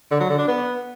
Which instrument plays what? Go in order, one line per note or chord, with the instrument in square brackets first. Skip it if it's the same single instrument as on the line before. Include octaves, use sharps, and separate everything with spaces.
[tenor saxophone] D3
F#3
D3
D4
B3